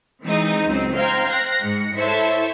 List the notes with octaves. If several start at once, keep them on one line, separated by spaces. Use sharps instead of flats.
E3 G#3 C4 D#4
C#2 F#2 C4
C5 F5 G5 A#5 F6 G#6
F#6 A#6 C7
G#2 C#7
E4 A4 C5 C#5 E5